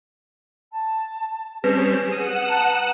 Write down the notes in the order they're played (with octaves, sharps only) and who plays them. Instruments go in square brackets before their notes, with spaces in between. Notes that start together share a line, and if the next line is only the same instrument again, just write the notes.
[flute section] A5
[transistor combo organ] G3 C4 C#4 [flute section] G#4 [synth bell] B4
[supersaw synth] F#5 E7 [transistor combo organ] D#6
[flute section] A5 A#5